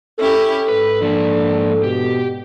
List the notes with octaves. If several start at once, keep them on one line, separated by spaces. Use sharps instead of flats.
C#4 E4 G4 A4
G#2 B4
F3 A#3 D4
B2 G4